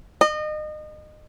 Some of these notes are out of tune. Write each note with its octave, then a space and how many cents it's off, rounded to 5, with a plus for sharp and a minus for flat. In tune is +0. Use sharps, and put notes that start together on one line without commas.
D#5 -30